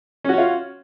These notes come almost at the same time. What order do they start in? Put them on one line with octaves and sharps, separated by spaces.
C#4 F#4 C#5 F4